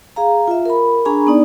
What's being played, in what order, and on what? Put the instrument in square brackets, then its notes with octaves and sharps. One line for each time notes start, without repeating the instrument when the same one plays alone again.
[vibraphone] G#4 F5 A#5
F4 E5
A#4 B5
D4 G#4 G#5 A#5 B5 C#6
B3 D#4 D5